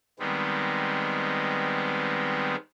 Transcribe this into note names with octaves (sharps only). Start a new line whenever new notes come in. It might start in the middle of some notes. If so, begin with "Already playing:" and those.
D#3 G3 G#3 B3 C4